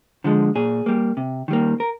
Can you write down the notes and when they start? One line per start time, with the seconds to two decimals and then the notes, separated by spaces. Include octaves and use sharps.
0.24 D3 F3 G#3
0.55 A#2 G#4
0.86 G3 A#3
1.17 C3
1.48 D#3 G3 A#3
1.80 A#4